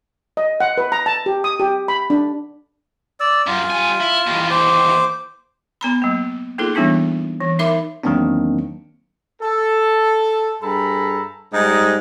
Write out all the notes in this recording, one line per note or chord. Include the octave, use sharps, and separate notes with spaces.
D#5
F#5
B4
A#5
A5
G4
D#6
G4
B5
D4
D5 E6
F#2 F4
G3 G#5
E4
D#2 E3
C5 D6
B3 A#5 B5
F#3 A#3
A#3 D#4 F4 G#4 A4
E3 G3 B3 D4 E4
E3
D#4 A#4 E5 B5 D6
E2 D#3 F#3 A#3 C4 D4
A4
G2 G#4 A4 A#5 B5
G#2 G3 D#4